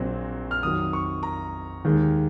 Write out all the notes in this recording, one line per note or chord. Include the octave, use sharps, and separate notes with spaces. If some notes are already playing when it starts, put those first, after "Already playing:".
Already playing: A#1 A#2 F#3 C4
F6
F2 D#3 F#3 D#6
C#6
A#5
D#2 D#3 G#3